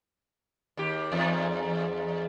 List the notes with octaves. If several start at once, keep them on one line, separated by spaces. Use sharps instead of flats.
D#2 G4
E2 G#2